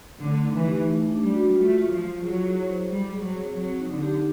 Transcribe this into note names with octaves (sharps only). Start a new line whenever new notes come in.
D3 A3
D#4
E3
G4
A3
D4
G3
F#4
A3 F4
F4
F3
F4
F#3 G#4
E4
C5
G3 G#4
G#4
F#3
C4
F#3 C4
D#4
D3
G4